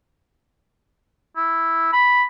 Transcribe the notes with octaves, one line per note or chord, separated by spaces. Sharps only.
E4
B5